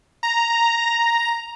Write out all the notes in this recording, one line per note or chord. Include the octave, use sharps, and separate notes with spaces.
A#5